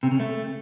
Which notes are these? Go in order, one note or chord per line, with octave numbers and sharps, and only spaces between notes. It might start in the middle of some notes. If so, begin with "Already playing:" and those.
C3
C#3
A3